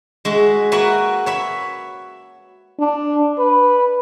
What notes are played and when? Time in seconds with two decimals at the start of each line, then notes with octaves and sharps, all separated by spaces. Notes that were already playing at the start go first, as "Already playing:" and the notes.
0.25 G#3 F#4 E5
0.72 A#3 F#4 B4 E5 F#5 G#5
1.26 C#5 E5 B5
2.79 D4
3.39 B4